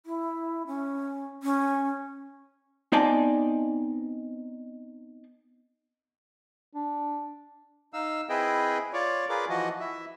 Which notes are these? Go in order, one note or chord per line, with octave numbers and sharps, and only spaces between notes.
E4
C#4
C#4
B3 C4 D#4 D5 G#5 A5
D4
D#4 F5 E6
C4 E4 G#4 B4 D#5 G5
F4 C#5 D5
F4 G#4 A#4 B4 D6
E3 F3 F#4 D#5
E4 E5